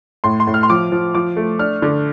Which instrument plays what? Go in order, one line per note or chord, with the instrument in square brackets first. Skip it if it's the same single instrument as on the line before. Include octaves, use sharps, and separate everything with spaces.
[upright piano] A2 C6
C6
A2
F6
C6
F3 D6
F3
F3 D6
A3
D4 F6
D3